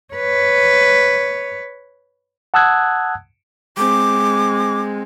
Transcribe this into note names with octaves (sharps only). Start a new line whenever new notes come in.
B4 C#5
F#5 A5 D#6 E6 F#6 G#6
G#3 C4 D6